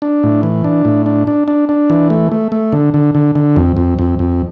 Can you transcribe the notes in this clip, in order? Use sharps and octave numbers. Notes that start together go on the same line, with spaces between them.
D4
A2
E3
D4
A2
D4
D4
D4
D4
E3
A3
A3
A3
D3
D3
D3
D3
F2
F2
F2
F2